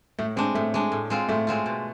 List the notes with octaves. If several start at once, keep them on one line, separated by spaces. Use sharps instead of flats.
A2 A3
G#3 C4 D4
A2 A3
G#3 D4
A2
G#3 C4 F4
A2 A3
G#3 C4 F4
B2